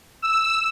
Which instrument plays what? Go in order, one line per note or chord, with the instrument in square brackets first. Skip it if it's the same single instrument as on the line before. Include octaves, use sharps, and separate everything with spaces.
[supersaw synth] E6